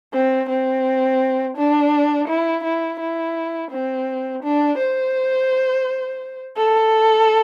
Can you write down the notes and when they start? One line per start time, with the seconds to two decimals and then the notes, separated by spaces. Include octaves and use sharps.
0.13 C4
0.49 C4
1.57 D4
2.27 E4
2.63 E4
2.99 E4
3.71 C4
4.43 D4
4.78 C5
6.57 A4